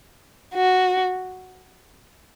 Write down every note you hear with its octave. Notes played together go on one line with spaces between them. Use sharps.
F#4